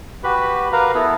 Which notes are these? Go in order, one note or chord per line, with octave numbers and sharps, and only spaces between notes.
F#4 G4 B4 B5
A#4 B4 F5 A#5
B3 E4 A4